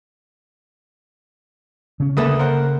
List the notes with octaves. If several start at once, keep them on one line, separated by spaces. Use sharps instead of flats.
C#3 C#4
D2 A#3 A4 B4 E5 D#6
A#4 C5 F#5